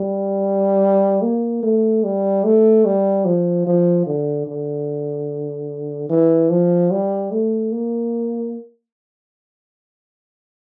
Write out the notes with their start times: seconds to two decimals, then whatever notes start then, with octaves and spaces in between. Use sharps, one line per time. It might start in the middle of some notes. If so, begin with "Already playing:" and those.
Already playing: G3
1.22 A#3
1.63 A3
2.04 G3
2.44 A3
2.85 G3
3.25 F3
3.66 F3
4.07 D3
4.47 D3
6.09 E3
6.50 F3
6.91 G3
7.31 A3
7.72 A#3